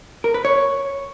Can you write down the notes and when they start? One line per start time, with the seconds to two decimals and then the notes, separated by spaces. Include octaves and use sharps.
0.24 A#4
0.34 B4
0.45 C#5